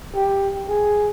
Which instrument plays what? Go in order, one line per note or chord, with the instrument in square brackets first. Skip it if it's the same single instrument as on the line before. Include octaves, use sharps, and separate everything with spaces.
[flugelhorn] G4
G#4